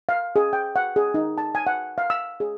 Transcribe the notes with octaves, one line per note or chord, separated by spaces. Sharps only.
F5
G#4
G5
F#5
G#4
D#4
A5
G#5
F#5
F5
E6
G#4